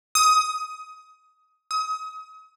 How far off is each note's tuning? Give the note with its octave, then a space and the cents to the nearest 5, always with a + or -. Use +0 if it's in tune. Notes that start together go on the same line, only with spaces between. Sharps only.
D#6 +20
D#6 +30